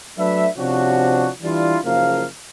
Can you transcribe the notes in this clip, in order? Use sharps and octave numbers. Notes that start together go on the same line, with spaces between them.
F#3 A3 D4 B4 E5
C3 F3 C#4 D4 F#4
E3 G3 D4 E4 F4
F#1 C#3 F3 A#3 F5